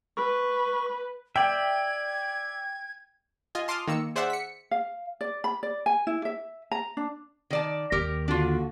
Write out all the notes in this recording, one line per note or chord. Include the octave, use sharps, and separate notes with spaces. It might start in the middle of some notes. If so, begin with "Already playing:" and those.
B4 C#6
D5 E5 G5 G#6
F4 D#5 G#5
A5 C6 D6 D#6 F6
D#3 A#3 E6 C#7
G#4 C5 D5 E5 F#5 E6
B6 C#7
F5
D5
B5
D5
G#5
E4
E5
A#5
D4
D#3 D5 A5
D#2 G4 A#4
D3 A#3 D4 F4 F#4